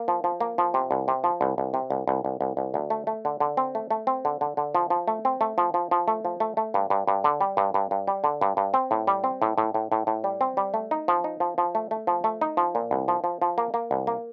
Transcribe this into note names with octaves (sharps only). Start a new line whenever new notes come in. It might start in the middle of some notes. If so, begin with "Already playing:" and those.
Already playing: A#3
F3
F3
A#3
F3
C3
C2
C3
F3
C2
C2
C3
C2
C2
C2
C2
C2
D2
A3
A3
D3
D3
C4
A3
A3
C4
D3
D3
D3
F3
F3
A3
C4
A3
F3
F3
F3
A3
F3
A3
A3
G2
G2
G2
D3
G3
G2
G2
G2
G3
D3
G2
G2
C4
A2
G3
C4
A2
A2
A2
A2
A2
G3
C4
G3
A3
D#4
F3
D#4
F3
F3
A3
A3
F3
A3
D#4
F3
A#2
C2
F3
F3
F3
A#3
A#3
C2
A#3